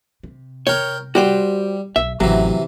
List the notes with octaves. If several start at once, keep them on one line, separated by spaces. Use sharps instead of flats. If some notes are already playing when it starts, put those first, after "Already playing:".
C3
A#4 C#5 G5
G3 F#4 G4 C5
B1 E5
A1 C3 E3 F#3